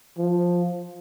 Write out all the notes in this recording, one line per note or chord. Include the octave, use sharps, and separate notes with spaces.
F3